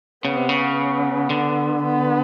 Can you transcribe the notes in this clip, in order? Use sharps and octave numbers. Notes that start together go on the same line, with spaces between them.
C#3 B3
C3
C#3
B3
D3
B3